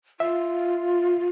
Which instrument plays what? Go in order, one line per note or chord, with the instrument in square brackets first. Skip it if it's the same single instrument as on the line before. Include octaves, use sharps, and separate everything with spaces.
[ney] F4 [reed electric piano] E5